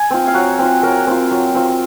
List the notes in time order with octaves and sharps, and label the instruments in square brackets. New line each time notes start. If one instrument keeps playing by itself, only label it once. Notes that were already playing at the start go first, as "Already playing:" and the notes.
Already playing: [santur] G#5
C4 F4
F5
F#3 F#5
C4 F4
F#3 A#4
C4 F4
F#3
C4 F4